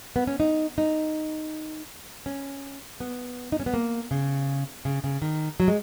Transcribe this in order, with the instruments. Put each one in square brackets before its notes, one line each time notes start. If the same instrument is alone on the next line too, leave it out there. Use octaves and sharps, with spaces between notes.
[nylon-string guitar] B3
C#4
D#4
D#4
C#4
B3
D#4
C#4
B3
A#3
C#3
C#3
C#3
D#3
F#3
G#3